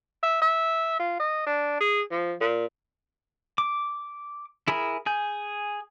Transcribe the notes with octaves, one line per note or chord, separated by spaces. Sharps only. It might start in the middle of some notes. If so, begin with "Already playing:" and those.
E5
E5
F4
D#5
D4
G#4
F3
A#2
D6
E4 G#4 A#4 B5
G#4 G#5 G6